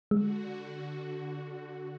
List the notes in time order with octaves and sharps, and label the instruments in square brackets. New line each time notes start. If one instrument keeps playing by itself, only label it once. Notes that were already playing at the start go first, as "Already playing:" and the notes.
[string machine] D3 F#4 [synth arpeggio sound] G#3